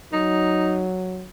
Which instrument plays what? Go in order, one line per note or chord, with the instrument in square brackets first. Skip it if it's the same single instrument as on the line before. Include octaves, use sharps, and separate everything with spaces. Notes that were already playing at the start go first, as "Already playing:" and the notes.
[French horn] F#3 [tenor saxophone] D#4